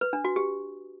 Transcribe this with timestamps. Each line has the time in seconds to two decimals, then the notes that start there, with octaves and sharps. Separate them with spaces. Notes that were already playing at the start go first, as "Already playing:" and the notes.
0.01 B4
0.13 D4
0.25 F#4
0.36 G4